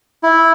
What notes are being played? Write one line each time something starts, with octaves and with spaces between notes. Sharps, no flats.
E4